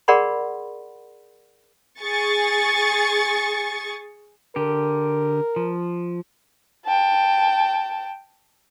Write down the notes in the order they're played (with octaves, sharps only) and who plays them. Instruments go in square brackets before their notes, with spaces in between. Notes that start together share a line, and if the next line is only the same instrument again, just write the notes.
[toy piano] G#4 A#4 D5 F#5 B5 C6
[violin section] G#4 C#6 A6
[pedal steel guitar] D3 G4 [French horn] A#4
[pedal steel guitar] F3
[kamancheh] G5 A5